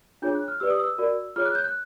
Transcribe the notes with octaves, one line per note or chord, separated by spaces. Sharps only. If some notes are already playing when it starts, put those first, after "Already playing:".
D4 F4 G#4 C#5 G6
F#6
F6
G4 B4 D5 E6
D#6
E6
F#4 A#4 D5
F4 G#4 C#5 F6
F#6
G6
F#6